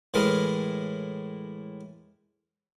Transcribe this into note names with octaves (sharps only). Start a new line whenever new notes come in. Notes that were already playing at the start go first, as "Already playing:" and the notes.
A2 E3 G#3 A#4